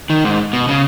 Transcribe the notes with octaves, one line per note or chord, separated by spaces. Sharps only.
D#3
G#2
B2
C#3